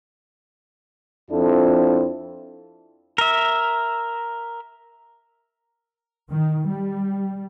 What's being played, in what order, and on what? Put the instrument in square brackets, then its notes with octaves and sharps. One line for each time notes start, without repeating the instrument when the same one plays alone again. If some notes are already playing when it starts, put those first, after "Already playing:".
[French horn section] F2 C4 D4 E4 F4 A4
[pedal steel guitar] A#4 E5
[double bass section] D#3
G3